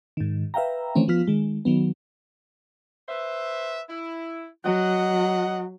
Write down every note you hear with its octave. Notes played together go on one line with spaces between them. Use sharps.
G#2 D#3
B4 E5 F5 G5 A#5
D#3 E3 A3 C4 C#4
F3 B3 F4 F6 B6
D#3 G#3
D#3 F#3 B3
B4 C5 E5
E4
F#3 D#5 F#5